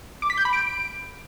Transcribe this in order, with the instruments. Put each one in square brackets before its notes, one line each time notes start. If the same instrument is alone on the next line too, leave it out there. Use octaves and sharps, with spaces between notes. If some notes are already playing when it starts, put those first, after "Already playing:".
[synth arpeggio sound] D6
B6
G6
B5
D7